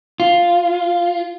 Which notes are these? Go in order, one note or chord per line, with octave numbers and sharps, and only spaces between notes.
F4